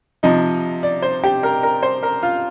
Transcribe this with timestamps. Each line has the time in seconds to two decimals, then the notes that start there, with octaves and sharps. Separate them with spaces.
0.23 C3 F3 D#4 D#5
0.83 D5
1.02 C5
1.24 G4 G5
1.43 A#4 A#5
1.63 A#4 A#5
1.83 C5 C6
2.03 A#4 A#5
2.23 F4 F5